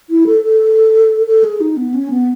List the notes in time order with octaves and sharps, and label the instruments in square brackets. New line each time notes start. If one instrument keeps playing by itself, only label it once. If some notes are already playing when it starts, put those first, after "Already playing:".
[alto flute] E4
A4
A4
A4
G#4
D#4
B3
C#4
B3